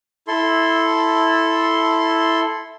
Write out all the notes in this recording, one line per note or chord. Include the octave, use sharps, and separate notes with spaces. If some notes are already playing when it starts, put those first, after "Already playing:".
E4 A4 C6